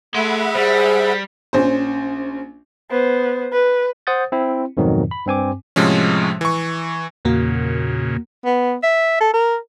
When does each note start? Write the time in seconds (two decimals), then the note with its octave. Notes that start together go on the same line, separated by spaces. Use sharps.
0.14 A3 G#4 E5 F#5 B5 C6
0.55 G3 G#4 C5
1.53 A#1 C#4 C5
2.90 B3 C5
3.53 B4
4.07 C5 F#5 D#6 G6 A6
4.32 C4 E4
4.77 F2 G#2 B2 D#3 F#3
5.11 B5
5.26 G2 C4 G#5 D6
5.76 A2 C3 F3 G#3 C#4
6.41 E3 C#6
7.25 E2 A#2 C#3 A#3 F#4
8.45 B3
8.83 E5
9.21 A4
9.34 A#4